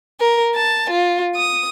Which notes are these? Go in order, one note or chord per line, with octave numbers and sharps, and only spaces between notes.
A#4
A5
F4
D#6